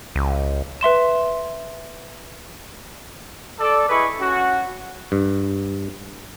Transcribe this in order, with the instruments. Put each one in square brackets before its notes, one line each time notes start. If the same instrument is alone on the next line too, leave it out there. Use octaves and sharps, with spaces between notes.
[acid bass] C#2
[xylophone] B4 E5 C6 E7
[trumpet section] A4 D5
E4 G#4 B4 D#5 B5 C#6
C#4 F#4
[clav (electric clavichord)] G2